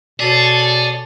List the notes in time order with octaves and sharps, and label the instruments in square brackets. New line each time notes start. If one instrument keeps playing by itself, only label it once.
[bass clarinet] B2 [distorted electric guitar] G#4 [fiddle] A4 C#5 [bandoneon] D5